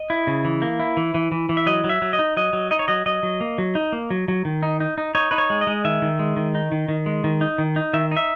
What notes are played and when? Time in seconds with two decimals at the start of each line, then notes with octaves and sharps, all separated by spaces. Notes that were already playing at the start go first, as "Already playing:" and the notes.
Already playing: D#5
0.10 E4
0.27 C#3
0.45 E3
0.62 A#3
0.80 E4
0.97 E3
1.14 E3
1.32 E3
1.49 E3
1.57 E5
1.66 F#3 D#5
1.84 F#3
1.89 E5
2.02 F#3
2.13 D#5
2.19 D#4
2.37 F#3 D#5
2.53 F#3
2.71 D#4 D#5
2.79 C#5
2.88 F#3 D#5
3.06 F#3 D#5
3.23 F#3
3.41 A#3
3.58 F#3
3.75 D#4
3.92 A#3
4.10 F#3
4.28 F#3
4.45 D#3
4.63 D#4
4.80 D#4
4.98 D#4
5.15 D#4 C#5
5.31 D#4 B4
5.38 C#5
5.50 G#3
5.61 D#5
5.67 G#3
5.85 D#3 E5
6.02 D#3
6.19 G#3
6.37 D#3
6.55 D#4
6.72 D#3
6.88 D#3
7.06 G#3
7.24 D#3
7.41 D#4
7.58 D#3
7.76 D#4
7.93 D#3 E5
8.11 D#4
8.17 E5